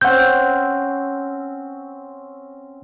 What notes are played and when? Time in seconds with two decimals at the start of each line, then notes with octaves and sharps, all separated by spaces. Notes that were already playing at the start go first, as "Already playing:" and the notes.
0.01 C4 C#4 F#5 G6